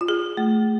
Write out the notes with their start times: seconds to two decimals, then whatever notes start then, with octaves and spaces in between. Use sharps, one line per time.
0.01 F4
0.08 G#4
0.37 A3